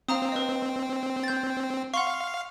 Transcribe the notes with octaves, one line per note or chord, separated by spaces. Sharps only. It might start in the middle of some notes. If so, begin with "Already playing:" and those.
C4 F5 A#5 D#6
B4 C5 D#5
G6 A6
F5 F#5 C6 C#6